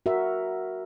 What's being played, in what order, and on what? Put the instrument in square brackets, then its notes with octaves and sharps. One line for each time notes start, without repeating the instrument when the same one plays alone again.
[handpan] F#4 A#4 E5